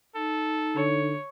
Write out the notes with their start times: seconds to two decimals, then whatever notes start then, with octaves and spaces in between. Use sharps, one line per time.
0.15 D#4 A4
0.76 D3 C#5